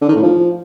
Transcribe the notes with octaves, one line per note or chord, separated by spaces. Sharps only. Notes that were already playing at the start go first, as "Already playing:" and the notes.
D3
D#3
A2
F3